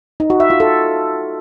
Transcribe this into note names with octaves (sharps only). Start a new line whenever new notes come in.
D#4
F#4
E5
F4
A4